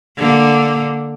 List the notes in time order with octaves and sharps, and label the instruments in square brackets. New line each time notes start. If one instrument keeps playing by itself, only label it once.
[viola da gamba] D3 A#3